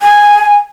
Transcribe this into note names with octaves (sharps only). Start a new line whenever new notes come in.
G#5